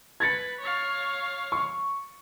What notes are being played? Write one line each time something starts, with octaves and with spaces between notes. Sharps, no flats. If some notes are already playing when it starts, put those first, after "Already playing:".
B4 G#6 A6 C#7
C#5 F5
C#6